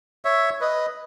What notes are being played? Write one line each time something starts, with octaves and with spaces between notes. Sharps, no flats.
C#5 E5
B4 D#5